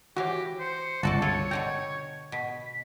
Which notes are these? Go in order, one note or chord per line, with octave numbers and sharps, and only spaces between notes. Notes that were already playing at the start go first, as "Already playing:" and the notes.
E3 F#4 G4 C#5 F5 A#6
C5 C#7
G1 C#2 F#4 A4 D5 A5
F4 A4 C#5
B2 D3 G5 A#5
B2 B6